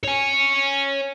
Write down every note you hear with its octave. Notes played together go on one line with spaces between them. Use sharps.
C#5 G#5